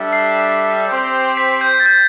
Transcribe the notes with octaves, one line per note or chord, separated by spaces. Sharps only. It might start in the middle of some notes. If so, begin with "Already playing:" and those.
Already playing: G3 D4 A4 E5
C7
C4 G4 C5
B6
G6
A6
G6